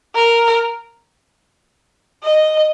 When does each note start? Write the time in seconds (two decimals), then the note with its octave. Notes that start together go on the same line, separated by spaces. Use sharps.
0.15 A#4
2.23 D#5